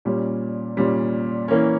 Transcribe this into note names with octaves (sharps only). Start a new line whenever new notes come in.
A#2 G3 C#4
A#2 G3 C#4
E3 A#3 C#4